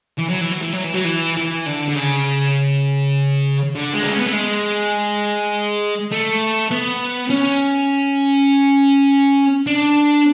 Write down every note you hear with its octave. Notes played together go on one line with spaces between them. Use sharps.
E3
F#3
E3
F#3
E3
F#3
E3
F#3
E3
E3
D3
D3
C#3
D3
G#3
D4
C#4
B3
A3
G#3
A3
B3
C#4
D4